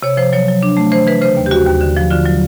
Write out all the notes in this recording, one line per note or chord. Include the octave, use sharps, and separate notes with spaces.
C3 C#5
F3 C5
F#3 C#5
F#3
D4
A3
E3 C5
E3 B4
C#3 C5
D#2
G4
D#2 F#4
D#2
D3
F3
D3 F4
F#3